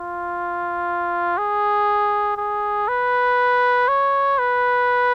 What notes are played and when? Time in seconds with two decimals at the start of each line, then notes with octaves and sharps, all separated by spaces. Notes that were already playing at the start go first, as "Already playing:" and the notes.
Already playing: F4
1.38 G#4
2.37 G#4
2.88 B4
3.88 C#5
4.38 B4